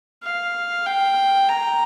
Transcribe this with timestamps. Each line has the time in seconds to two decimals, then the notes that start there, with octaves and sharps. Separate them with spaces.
0.24 F5
0.86 G5
1.49 A#5